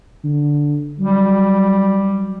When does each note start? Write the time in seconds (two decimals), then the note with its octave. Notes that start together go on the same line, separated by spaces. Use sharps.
0.24 D3
0.99 F#3 G3